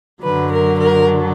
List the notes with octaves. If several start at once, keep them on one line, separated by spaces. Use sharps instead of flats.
F#2 D3 F#3 B4
A#4
A#4